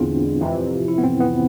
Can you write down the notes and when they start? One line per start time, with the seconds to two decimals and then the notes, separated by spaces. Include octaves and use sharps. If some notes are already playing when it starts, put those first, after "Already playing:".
Already playing: E2 D3 G#3 B3 C4 D4 E4 F4
0.40 F2 C3 E3
0.88 E4
0.98 B3
1.04 C4
1.20 B3